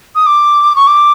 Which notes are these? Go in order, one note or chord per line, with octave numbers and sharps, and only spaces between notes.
D#6
D6
C#6
D6